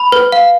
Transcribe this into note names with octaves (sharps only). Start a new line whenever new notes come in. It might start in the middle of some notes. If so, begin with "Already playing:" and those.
Already playing: B5
B4
F5